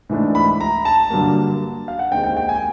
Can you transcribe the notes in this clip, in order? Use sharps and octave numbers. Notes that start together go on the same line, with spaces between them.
G#2 E3 A3 D4
B5
A#5
A5
G2 D3 F#3 A#3
F5
F#5
D#2 D#3 G#3 C4 G5
G5
G5
G#5